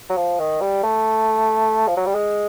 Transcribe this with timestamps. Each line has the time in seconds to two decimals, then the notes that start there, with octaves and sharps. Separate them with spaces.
0.09 F#3
0.17 F3
0.39 D#3
0.61 G3
0.83 A3
1.87 F3
1.97 F#3
2.06 G3
2.15 G#3